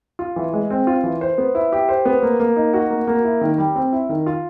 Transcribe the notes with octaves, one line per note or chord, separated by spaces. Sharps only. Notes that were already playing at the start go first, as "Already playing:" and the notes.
F4
E3
G#3
C4
F4
E3
C5
B3
E4
G4
C5
B3
A#3
A#3
D#4
F#4
A#3
A#3
E4
D#3
G3
C4
E4
D#3
F4